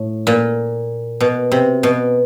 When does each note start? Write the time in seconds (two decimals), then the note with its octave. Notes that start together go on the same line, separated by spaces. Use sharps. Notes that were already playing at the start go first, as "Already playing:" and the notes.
Already playing: A2
0.27 A#2
1.20 B2
1.52 C3
1.83 B2